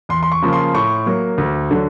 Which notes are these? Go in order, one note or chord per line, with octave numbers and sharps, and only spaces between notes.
E2 C6
C6
C#6
C#3 F3 A#3
C6
A2 C#6
F#3 A#3
D2
D3 F#3